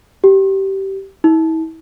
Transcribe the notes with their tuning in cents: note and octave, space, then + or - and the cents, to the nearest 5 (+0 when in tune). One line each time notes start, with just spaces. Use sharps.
G4 -20
E4 -40